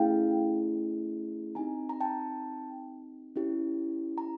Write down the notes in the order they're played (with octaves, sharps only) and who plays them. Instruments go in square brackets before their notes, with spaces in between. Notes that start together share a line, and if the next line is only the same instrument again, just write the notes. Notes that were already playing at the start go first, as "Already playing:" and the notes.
Already playing: [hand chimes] A3 C#4 E4 G#4 F5 G5
C4 D#4 G4 G#5 A#5
A#5
G5 A5
C#4 E4 G4
A#5